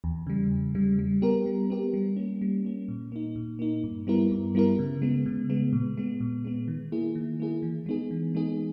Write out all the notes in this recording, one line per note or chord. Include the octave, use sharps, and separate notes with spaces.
E2
C#3 G3
E2
C#3 G3
G3
B3 G4 A#4
G3
B3 G4 A#4
G3
A#3 C#4
G3
A#3 C#4
A#2
A#3 D#4
A#2
A#3 D#4
G2
G3 B3 E4 A#4
G2
G3 B3 E4 A#4
C#3
G#3 B3
C#3
G#3 B3
A#2
G#3 B3
A#2
G#3 B3
D#3
A#3 E4 G#4
D#3
A#3 E4 G#4
E3
G#3 B3 D#4 G#4
E3
G#3 B3 D#4 G#4